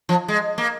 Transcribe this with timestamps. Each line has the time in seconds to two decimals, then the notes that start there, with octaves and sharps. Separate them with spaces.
0.09 F3
0.28 G#3
0.58 A#3